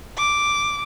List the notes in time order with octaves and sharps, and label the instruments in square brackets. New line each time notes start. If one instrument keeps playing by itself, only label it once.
[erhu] D6